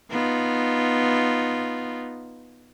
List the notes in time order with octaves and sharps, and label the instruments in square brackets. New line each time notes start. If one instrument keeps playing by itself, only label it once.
[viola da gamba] B3 D#4 F4